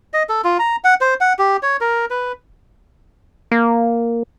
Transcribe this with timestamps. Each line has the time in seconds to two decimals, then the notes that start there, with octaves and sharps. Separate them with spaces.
0.13 D#5
0.29 A4
0.44 F4
0.59 A#5
0.84 F#5
1.01 C5
1.21 F#5
1.39 G4
1.63 C#5
1.81 A#4
2.10 B4
3.51 A#3